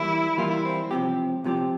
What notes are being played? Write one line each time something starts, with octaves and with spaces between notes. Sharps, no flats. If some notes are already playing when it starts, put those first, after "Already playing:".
Already playing: E3 G3 A#3 E4
E3 G3 A#3 F4
E4
C4
C#2 C3 F3 C4 G4
C#2 C3 F3 C4 G4